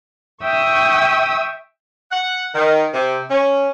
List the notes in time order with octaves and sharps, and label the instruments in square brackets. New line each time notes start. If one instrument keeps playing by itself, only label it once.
[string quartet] E5 G5 C#6 D#6 E6
[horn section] F#5
D#3
C3
C#4